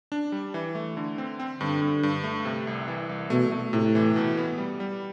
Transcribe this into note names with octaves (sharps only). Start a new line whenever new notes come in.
D4
G3
E3
A3
D3
C4
C4
G2 D3
G2
G2
A3
C3
C2
E3
C2
B2 A3
A3
A2 C3
E3
B2
B3
G3
G3